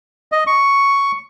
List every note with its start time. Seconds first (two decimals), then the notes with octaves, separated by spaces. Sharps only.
0.32 D#5
0.47 C#6